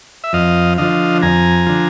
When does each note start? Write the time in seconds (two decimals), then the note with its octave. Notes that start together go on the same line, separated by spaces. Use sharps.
0.24 E5
0.33 F2 D#5 F5
0.78 D3 F3 D#5 F5
1.22 F2 G#5 A#5
1.66 D3 F3